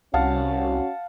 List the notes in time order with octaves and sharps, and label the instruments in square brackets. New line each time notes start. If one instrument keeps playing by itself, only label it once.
[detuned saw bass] C2 [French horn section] C#4 F#4 [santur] F5 F#5 A5